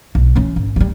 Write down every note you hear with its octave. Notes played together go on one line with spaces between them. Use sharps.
B1
E3 C#4
G#1
C#3 G3